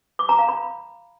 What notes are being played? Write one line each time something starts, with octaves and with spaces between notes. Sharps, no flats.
D6
A#5
F5
B5